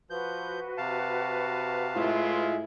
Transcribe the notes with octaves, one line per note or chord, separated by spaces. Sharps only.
F3 F#4 B4 G6
C3 F5 A5
A2 G#3 E4 F4